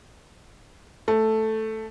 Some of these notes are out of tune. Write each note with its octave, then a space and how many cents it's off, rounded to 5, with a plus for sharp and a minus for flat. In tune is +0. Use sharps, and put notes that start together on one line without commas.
A3 +0